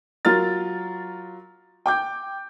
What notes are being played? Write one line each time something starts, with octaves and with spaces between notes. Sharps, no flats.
F#3 F4 A#4 F6 A6
G5 D6 G6